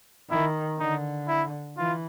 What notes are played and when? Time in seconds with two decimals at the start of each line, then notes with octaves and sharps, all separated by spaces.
0.30 D#3 E4
0.80 D3 D#4
1.28 E4
1.78 E3 F4